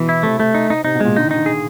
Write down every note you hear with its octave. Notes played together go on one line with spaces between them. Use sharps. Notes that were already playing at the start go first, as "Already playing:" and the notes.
Already playing: B2 E3
E4
C3 A3
A3
D#4
D#4
C3 D#4
B2
A#2 G#3
D3 D#4
D#3 D#4
D3
G#4